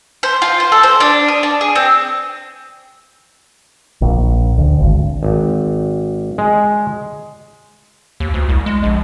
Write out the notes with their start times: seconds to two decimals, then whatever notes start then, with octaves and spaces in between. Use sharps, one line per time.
0.23 C5
0.42 F4
0.60 C5
0.72 A4
0.83 C5
1.00 D4
1.28 D#6
1.43 D4
1.61 G#4
1.76 C4
4.02 A#1
4.58 D2
4.80 G#1
5.23 G#1
6.38 G#3
8.20 D#2
8.34 D2
8.49 C2
8.66 G#3
8.83 A#1